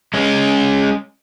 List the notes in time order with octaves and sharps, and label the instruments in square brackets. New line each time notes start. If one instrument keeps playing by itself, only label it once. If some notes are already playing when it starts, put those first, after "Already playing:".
[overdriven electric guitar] G#3 C#4